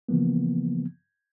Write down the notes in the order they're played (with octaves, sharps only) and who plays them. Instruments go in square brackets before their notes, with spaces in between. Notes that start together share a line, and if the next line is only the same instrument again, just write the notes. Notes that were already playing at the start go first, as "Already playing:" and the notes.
[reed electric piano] C#3 E3 F3 A#3 B3